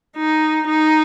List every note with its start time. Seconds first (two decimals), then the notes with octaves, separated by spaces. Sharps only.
0.17 D#4
0.68 D#4